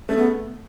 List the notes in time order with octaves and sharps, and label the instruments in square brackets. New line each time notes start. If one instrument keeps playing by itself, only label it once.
[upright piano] A3 [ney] C#4
[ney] B3